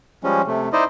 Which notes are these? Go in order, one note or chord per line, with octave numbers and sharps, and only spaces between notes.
F3 G3 G#3 C#4
C3 A3
D#4 E4 C5 D5 D#5